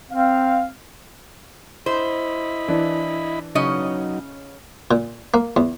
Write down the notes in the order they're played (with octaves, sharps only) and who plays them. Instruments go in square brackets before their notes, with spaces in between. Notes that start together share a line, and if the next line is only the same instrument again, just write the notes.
[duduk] C4 [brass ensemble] F5
[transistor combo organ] E4 D#5 B5 [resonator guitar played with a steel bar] C5
[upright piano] E3 D4
[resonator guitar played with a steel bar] C#3 C#4 D#5 [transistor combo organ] F#3 D#4
[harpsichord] A#2
A#3
E2